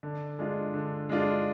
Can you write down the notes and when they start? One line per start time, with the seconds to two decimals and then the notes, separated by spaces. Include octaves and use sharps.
0.03 D3
0.39 G#3 D4 F4
0.74 D3
1.09 G#3 D4 F4